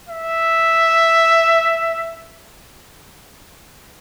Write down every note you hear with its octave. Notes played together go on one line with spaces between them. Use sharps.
E5